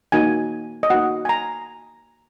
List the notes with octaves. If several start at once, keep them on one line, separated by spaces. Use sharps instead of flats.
A#3 D#4 F#4 G#5
D#5
A#3 D#4 F#4 F#5
G#5
A#5